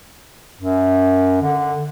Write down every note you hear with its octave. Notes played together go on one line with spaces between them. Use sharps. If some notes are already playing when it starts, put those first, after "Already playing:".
F#2
D3